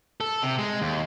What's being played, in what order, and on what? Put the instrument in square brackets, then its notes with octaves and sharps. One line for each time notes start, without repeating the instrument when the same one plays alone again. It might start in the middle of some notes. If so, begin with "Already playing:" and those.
[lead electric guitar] A4
C3
G#3
D#2